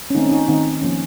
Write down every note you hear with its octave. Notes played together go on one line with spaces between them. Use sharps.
C#4
D#3 A3 C4 D#4
C#4
D#4
D#3 A3 C4 D#4
F3 A#3 C#4